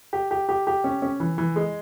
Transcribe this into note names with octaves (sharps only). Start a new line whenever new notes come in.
G4
G4
G4
G4
C#4
C#4
E3
E3
G#3